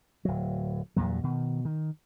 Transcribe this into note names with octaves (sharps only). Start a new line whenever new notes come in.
D1 F#3
E2 G2 A#2 F#3
B2 D#3
D#3